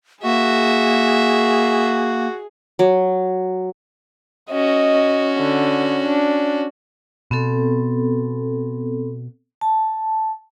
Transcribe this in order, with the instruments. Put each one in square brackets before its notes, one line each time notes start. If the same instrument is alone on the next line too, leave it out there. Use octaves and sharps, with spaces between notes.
[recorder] A#3 [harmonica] F#4 [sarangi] G#4 [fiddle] E5
[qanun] F#3
[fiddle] C#4 F#4 [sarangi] D#5
[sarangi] D3
D4
[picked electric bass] B2 [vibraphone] B3 C4 A4
[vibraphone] A5